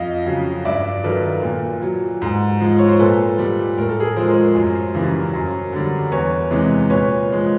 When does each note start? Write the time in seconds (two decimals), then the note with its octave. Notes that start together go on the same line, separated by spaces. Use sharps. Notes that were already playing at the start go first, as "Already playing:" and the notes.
Already playing: F2 D#5 F5
0.26 C#3 F#3
0.65 G2 D5 E5
1.04 D#3 F#3 A4 B4
1.43 A#2
1.82 F#3
2.22 G#2
2.60 F3 G#3
2.78 C#5
2.89 C5
2.99 A#2 A4 B4
3.38 G3
3.78 A2 A#4
3.89 A4
4.00 G#4 A#4
4.16 F3 G#3 A#4 C5
4.55 F#2
4.94 C#3 E3 G3
5.34 F#2
5.73 D3 G3
6.12 E2 B4 C#5
6.51 C3 E3 G#3
6.90 A#2 B4 C#5
7.29 F3 G#3